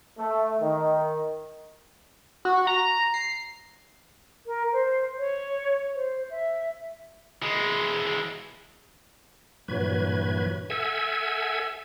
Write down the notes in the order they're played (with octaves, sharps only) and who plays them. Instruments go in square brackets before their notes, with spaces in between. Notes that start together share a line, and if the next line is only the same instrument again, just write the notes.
[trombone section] A3
D#3
[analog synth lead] F#4
A#5
C7
[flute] A#4
C5
C#5
C5
E5
[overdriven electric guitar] E3 G#3
[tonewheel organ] G2 A#2 E3 F#3 B4 G#6
A4 E5 F#5 G#5 E6 G#6